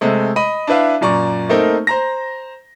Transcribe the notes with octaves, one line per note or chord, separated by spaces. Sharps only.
C3 G#3 A3
D#5 B5 D#7
D4 E4 B4 E5 F5
F#2 A#2 D5 A#5 C#6
A3 A#3 C4 D#4 A#4
C5 A#5 A#6